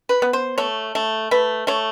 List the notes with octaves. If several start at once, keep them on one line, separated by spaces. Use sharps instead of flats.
B4
B3
C5
A3 C#5
A3
A3 B4
A3 C#5